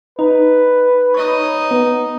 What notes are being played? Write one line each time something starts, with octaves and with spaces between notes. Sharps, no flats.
D#4 B4
D#4 C#5 D#5
B3